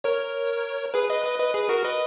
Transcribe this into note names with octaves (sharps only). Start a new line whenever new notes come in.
A#4 C#5
G#4 B4
B4 D#5
B4 D#5
B4 D#5
G#4 B4
F#4 A#4
B4 D#5